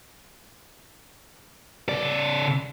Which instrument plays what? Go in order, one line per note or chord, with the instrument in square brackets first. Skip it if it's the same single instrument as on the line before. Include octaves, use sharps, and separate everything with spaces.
[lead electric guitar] C#3 D5